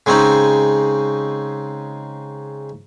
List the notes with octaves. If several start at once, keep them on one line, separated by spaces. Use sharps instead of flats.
C#3 G#3 C4 C#4 D#4